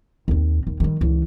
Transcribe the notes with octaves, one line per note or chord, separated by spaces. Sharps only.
D#2 C4
D#2
D#3 G3
C#2 E3